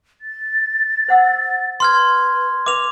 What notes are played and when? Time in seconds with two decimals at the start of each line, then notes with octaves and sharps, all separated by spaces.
0.21 A6
1.08 C5 F#5 E6
1.80 B4 C6 F6 G#6
2.66 B4 E5 D6 F7